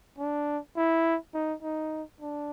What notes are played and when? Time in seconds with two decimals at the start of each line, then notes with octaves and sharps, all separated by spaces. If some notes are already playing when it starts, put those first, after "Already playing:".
0.18 D4
0.77 E4
1.34 D#4
1.62 D#4
2.21 D4